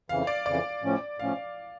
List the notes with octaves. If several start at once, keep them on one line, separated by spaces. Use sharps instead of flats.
F2 C#3 E3 F5
D5
F2 C#3 E3 D5
A2 F3 C#4
A2 F3 C#4 F5